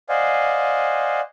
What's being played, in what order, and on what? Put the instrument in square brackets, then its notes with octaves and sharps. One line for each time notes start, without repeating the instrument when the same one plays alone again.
[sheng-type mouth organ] C5 D5 D#5 F5 F#5 G#5